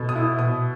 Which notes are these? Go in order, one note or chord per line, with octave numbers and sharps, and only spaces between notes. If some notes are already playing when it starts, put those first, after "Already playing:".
Already playing: B2 A3
D#6
E4
B2 D#6